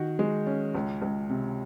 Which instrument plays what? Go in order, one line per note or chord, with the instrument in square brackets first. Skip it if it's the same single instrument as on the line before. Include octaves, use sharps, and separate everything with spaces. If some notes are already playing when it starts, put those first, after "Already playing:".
Already playing: [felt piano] D#3 F#4
G#3
C#4
C#2
C#2
C3